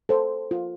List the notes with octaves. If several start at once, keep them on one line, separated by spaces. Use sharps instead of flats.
A4 C5
F4